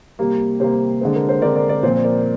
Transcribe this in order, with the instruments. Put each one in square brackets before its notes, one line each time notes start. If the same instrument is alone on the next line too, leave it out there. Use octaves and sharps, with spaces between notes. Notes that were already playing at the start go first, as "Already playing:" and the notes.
[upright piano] C3 G3 A#3
C3 G3 A#3 C5
D3 G#3 C4
A#4
C5
D3 G#3 C4 A#4 D5
A#4 D5
A#4 D5
A#2 F3 C4 C5
A#4 D5